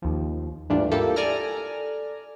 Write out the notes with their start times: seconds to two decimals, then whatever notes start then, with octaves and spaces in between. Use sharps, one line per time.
0.02 D#2 F3
0.70 G#2 E3 G3 A3 D4 F4
0.91 A#3 E4 F4 G4 A4
1.16 A4 D5 G#5 A#5 F6